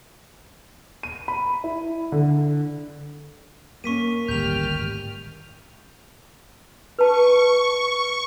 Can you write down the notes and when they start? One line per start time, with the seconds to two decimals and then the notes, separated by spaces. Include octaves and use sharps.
1.03 D#7
1.28 B5
1.64 E4
2.12 D3
3.84 A#3 C#4 C#6 B6 D#7
4.28 D1 G#1 F#2 G3 G4 F6 G6 F7
6.99 B4 A5 C#6